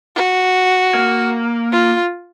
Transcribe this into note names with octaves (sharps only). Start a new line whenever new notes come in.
F#4
A#3
F4